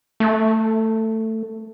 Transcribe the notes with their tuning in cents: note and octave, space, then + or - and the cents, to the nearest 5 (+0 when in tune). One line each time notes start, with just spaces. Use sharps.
A3 +15